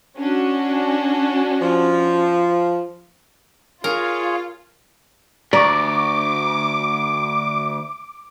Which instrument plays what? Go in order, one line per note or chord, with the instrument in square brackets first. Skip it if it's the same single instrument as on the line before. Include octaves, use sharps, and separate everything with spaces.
[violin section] C#4 D4 F#4
[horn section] F3
[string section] F4 [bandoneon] G#4 C#5 [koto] A#4
[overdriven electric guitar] D2 [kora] D5 [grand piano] A#5 C#6 [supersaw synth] D6